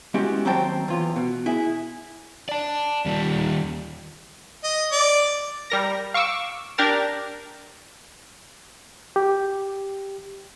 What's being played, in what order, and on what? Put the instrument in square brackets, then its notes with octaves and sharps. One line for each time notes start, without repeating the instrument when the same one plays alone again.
[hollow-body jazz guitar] G#3 B3 C#4 E4 F#4 G4
D#2 F#3 C4 C5 G5 A5
E2 F4
B2
E4 G#4
[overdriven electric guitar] D5 A5
D#2 G3
[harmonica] D#5
D5
[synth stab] G3 A#4 A#6
F5 C#6 D6 E6
D4 G4 A#4 A6
[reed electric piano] G4